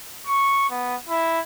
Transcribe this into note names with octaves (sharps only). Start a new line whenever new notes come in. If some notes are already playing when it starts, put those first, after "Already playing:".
C#6
B3
E4